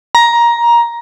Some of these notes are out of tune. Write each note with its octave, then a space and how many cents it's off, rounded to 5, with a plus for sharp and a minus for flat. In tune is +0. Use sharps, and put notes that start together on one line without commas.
A#5 +15